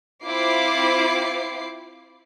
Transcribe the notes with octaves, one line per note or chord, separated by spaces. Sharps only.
C4 E4 F4 C5 D6 C7